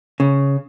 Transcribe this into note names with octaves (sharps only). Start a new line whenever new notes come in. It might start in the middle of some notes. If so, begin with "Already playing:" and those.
C#3